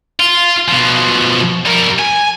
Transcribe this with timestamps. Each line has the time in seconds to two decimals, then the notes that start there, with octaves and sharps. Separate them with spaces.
0.20 F4
0.68 B2 F3
1.66 G3 A#4
1.99 G#5